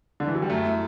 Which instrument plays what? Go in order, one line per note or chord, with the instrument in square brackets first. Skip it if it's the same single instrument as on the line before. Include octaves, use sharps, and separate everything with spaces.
[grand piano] D3
E3
F#3
G3
[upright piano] F#2 [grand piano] A3
[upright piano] E4